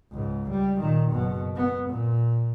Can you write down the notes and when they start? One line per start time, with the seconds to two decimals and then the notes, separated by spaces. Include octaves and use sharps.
0.12 C#2 G#2
0.50 G3
0.79 A#2 D#3
1.12 F#1 B2
1.56 B3
1.90 A#2